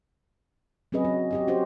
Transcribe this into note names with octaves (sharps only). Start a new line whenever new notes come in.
F#3 C4 C#4 G#4 B4 D#5
F#4
F#4 G4 D#5
C#4 F#4 G4 C5